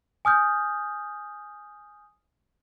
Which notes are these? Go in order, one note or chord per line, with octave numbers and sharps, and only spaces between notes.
G#5 D#6 F6 G6